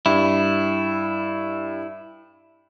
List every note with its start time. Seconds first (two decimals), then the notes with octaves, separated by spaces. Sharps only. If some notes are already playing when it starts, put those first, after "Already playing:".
0.06 G2 E4